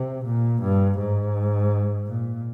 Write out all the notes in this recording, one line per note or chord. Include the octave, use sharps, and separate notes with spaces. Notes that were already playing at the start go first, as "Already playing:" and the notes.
Already playing: C3
A#2
G2
G#2
A#2